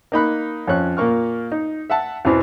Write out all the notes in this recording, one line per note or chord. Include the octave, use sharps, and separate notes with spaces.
A#3 D#4 B5 F#6
F2 C#4 C#5 F#6
A#2 A#3 C#6 F6
D#4
E5 F#5 A5
E2 B2 E3 C4